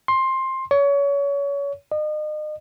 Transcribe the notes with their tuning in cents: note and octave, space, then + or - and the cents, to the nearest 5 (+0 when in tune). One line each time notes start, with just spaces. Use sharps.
C6 +15
C#5 +30
D#5 -35